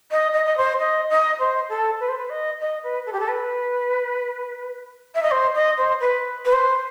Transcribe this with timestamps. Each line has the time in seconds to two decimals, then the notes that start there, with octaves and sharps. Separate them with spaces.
0.12 D#5
0.33 D#5
0.45 D#5
0.57 C5
0.80 D#5
1.10 D#5
1.39 C5
1.69 A4
2.00 B4
2.08 C5
2.18 B4
2.29 D#5
2.60 D#5
2.83 B4
3.06 A4
3.13 G4
3.20 A4
3.28 B4
5.15 E5
5.23 D#5
5.31 C5
5.55 D#5
5.78 C5
6.00 B4
6.45 B4
6.53 C5